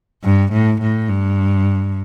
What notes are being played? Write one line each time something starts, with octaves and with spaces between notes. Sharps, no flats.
G2
A2
A2
G2